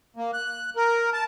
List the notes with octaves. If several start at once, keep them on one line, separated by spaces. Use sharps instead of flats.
A#3
F#6
A#4
A5